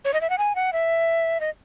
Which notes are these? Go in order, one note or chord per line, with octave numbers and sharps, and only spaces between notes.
C#5
D#5
E5
F#5
G#5
F#5
E5
D#5